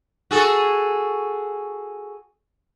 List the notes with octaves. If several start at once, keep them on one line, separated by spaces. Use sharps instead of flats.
F#4 G#4 A4